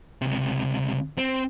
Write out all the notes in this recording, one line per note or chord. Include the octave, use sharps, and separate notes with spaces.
C#2 C3
C4